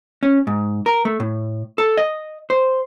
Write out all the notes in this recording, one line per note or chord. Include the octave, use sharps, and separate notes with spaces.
C#4
G#2
A#4
A3
A2
A4
D#5
C5